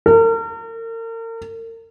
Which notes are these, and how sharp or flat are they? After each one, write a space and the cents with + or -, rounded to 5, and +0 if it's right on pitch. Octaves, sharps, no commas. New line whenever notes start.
A#4 -40